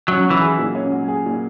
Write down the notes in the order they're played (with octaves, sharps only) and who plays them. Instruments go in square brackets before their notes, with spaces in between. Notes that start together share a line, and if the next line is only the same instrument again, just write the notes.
[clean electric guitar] F#3 [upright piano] C#4
[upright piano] F#3
[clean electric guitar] E3
[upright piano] G#4
A#2
C#4
F#3
G#4
A#2